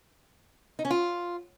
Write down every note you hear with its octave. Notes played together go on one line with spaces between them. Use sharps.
D#4
C#4
F4